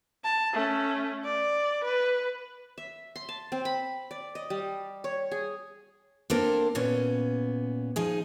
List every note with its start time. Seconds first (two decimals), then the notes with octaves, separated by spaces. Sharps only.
0.24 A5
0.53 A3 C#4
1.24 D5
1.84 B4
2.78 E5
3.16 C6
3.29 A5
3.52 C4
3.65 B5
4.11 D5
4.35 D#5
4.50 G3
5.04 C#5
5.31 G#4
6.30 A#3 C4 D4 A4 A#4 C5
6.75 A#2 B3 C#4
7.96 F3 D#4 G#4